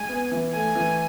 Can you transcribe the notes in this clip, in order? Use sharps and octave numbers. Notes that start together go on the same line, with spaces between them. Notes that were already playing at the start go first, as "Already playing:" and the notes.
Already playing: G#3 G#5
B3
E3
A3 G#5
E3